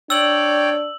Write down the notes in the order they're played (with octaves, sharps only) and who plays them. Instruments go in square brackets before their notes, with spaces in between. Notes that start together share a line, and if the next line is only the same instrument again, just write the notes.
[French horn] D4 [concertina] C#5 D5 G5 [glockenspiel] E6 F#7